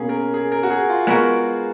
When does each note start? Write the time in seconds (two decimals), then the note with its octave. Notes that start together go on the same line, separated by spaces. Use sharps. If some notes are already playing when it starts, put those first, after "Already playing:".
Already playing: B2 A#3 C#4 G#4
0.09 A#4
0.34 G#4
0.52 A#4
0.63 F#4
0.70 G#4
0.89 F4
1.07 G#3 B3 F#4 A#4